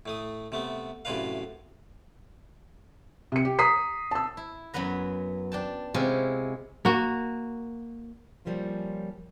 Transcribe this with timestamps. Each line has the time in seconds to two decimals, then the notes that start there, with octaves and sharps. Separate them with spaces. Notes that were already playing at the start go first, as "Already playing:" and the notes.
0.06 A2 A3 D#6
0.52 C3 A3 B3
1.05 F#2 A2 C3 D4 B4 F5
3.32 C3 C#7
3.45 G4
3.59 A#5 D#6 B6 C7
4.11 A5 E6
4.37 E4
4.74 F#2 F#3 B3 B4 A#5
5.52 D4 G5 A5
5.94 C3 G#3 C#4 E4 F4
6.85 A#3 F#4
8.45 F3 G3 A#3 C#4 F4